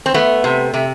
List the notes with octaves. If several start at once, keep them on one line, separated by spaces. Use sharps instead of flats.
C4
A3 B3
C3
C3